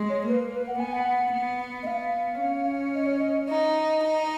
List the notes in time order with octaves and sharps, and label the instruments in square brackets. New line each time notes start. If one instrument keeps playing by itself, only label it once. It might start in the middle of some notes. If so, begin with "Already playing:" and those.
Already playing: [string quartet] G#3
[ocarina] C#5
[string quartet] A#3 [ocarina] B4
[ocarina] A#4
B4
F#5
[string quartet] B3 [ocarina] G#5
[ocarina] F#5
[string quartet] B3
[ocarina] D#5
[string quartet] B3 [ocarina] F5
[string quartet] C#4
[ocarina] D#5
C#5
D#5
[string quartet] D#4 [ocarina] D#5
[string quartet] D#4